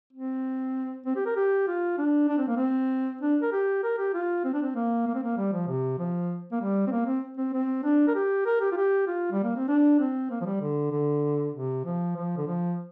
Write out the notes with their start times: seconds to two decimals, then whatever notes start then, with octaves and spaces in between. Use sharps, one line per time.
0.13 C4
1.06 C4
1.16 G4
1.26 A#4
1.36 G4
1.67 F4
1.98 D4
2.28 D4
2.38 C4
2.48 A#3
2.56 C4
3.21 D4
3.42 A#4
3.52 G4
3.83 A#4
3.98 G4
4.14 F4
4.44 C4
4.53 D4
4.62 C4
4.76 A#3
5.07 A#3
5.15 C4
5.23 A#3
5.37 G3
5.53 F3
5.68 C3
5.99 F3
6.52 A#3
6.60 G3
6.87 C4
6.91 A#3
7.07 C4
7.37 C4
7.53 C4
7.84 D4
8.08 A#4
8.15 G4
8.46 A#4
8.61 G4
8.72 F4
8.77 G4
9.07 F4
9.32 G3
9.44 A#3
9.56 C4
9.68 D4
10.00 C4
10.31 A#3
10.41 F3
10.46 G3
10.61 D3
10.92 D3
11.54 C3
11.85 F3
12.16 F3
12.37 D3
12.47 F3